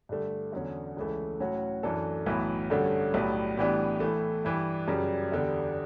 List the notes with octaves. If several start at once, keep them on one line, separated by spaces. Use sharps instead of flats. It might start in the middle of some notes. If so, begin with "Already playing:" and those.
G2 D3 A3
E2 D3 F#3 C#4
C#2 C#3 E3 A3
A2 F#3 C#4 F#4
F#2 E3 A3 D4 A4
B1 A2 E3 B3
G2 D3 A3 C#4 F#4
B1 A2 G3 B3
A2 E3 G3 B3 D4
A2 E3 A3
G2 E3 G3
F#2 C#3 G3
E2 D3 G3